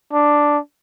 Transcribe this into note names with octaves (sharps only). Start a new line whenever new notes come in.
D4